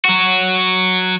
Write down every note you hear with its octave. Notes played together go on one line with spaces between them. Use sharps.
F#3 F#4